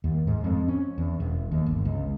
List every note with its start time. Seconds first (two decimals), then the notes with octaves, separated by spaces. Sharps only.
0.04 D#2
0.27 G#2
0.44 F2
0.68 C#4
0.98 E2
1.20 E1
1.51 D#2
1.66 G1
1.85 C#2